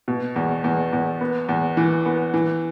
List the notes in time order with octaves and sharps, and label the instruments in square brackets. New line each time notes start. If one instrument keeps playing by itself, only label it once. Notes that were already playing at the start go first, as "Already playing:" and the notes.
[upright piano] B2
E2
E2
E2
B3
E2
E3
B3
E3